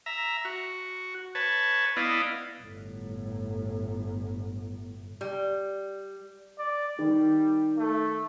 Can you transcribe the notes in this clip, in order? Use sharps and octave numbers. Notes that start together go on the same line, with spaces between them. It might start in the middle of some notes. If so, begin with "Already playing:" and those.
E5 A#5
F#4
B4 C#5 A5
B3 E4 D5 D#5 F5
G1 A2
G3
D5
D#3 G3
A3